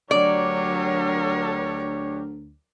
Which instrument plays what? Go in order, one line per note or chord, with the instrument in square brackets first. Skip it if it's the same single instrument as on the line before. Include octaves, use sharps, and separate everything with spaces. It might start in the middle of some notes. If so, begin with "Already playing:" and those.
[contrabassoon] D2 [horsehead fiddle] F#3 A#4 [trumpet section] D4 G4 C#5 [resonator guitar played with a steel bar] D5